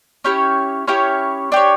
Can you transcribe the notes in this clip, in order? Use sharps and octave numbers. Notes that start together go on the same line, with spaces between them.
C#4 E4 G4 C#5
C#4 E4 G4 C#5
D4 G4 C#5